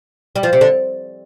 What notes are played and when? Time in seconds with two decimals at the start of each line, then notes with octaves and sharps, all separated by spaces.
0.36 G3
0.43 F3
0.53 C3
0.61 D3